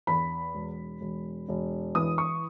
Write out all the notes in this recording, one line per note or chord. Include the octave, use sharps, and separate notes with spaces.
E2 B5
E1
E1
E1
E3 D#6
C#6